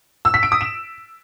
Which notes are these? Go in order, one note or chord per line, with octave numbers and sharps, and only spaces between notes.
E6
B6
D7
D#6
E7